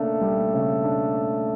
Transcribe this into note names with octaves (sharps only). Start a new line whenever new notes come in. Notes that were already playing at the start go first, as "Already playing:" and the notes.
Already playing: C#3 A3 A#3 D4
G3
C#3
D4